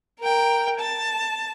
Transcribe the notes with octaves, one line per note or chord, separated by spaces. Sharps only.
A#4 G5
A5